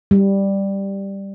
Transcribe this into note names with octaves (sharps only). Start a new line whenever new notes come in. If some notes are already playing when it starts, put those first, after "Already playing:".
G3